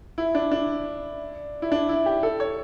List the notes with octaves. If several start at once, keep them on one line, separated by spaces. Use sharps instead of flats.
E4
D4
D4
E4
D4
E4
G4
A4
C#5